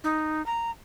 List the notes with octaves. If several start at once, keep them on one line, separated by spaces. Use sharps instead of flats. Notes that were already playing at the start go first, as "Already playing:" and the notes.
D#4
A#5